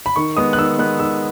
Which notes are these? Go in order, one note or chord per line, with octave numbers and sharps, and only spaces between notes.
B5
D#3 C#6
G#3 B3 D#6
F#6
D#3 E6
G#3 B3 F#6
D#3 E6